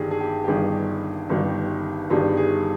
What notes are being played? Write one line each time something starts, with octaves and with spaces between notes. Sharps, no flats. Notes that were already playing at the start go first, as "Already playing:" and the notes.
Already playing: G1 G2 D#3 G3 G4 G#4
G#4
G4
G4
G1 G2 D#3 G3 G#4
G1 G2 D#3 G3
G1 G2 D#3 G3 G#4
G#4